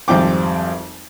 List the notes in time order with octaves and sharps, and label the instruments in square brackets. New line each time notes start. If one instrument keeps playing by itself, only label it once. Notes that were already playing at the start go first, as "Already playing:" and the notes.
[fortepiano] G#1 F2 G3 C4 G5 D6